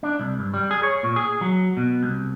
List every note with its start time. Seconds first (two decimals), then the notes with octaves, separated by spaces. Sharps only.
0.03 D4
0.19 C2
0.39 G2
0.54 G3
0.71 G#4
0.83 C#5
1.03 A#2
1.16 G#4
1.41 F#3
1.77 B2
2.03 C2